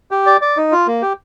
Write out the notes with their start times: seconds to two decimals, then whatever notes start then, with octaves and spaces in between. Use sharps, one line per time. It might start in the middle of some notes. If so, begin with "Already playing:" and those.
0.11 G4
0.26 D5
0.42 D5
0.57 D#4
0.72 F4
0.87 A#3
1.02 G4